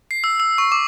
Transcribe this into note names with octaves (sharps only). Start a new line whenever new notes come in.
C7
E6
E6
C#6
D6